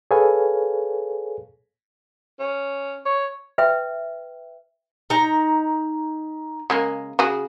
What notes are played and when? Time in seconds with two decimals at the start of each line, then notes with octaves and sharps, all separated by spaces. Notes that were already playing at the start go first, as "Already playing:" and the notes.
0.11 G#4 A4 B4 C#5 F5 G#5
2.40 C#4
3.06 C#5
3.58 B4 E5 G5
5.10 D#4 A#5
6.70 C#3 G#3 A#3
7.19 C#3 F#4 G#4